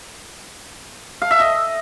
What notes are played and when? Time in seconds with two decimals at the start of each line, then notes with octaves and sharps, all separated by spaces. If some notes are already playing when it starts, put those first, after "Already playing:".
1.22 F5
1.31 E5
1.40 D#5